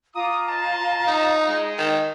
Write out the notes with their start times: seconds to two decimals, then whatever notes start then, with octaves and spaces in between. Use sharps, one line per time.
0.15 F4 F5 A#5 D6 D#6
0.46 C5 D#5 A5
1.07 D#4
1.47 G#3
1.79 D#3